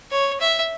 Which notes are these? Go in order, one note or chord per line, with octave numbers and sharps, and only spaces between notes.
C#5
E5